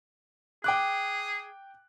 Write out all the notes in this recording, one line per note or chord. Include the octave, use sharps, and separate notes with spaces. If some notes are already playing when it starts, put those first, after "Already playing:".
G#4 G5 D6 F#6